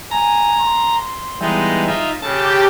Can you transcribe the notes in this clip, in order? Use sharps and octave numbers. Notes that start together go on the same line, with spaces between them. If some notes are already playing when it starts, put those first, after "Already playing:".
G#5 A#5
C6
E3 G3 G#3 B3 D#4
D#4 F4 E5
C#3 G4 A4 A5